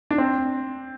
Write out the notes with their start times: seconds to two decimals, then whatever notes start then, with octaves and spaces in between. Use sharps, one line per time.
0.11 D4
0.18 C4